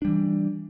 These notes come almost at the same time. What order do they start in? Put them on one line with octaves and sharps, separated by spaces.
D4 G3 E3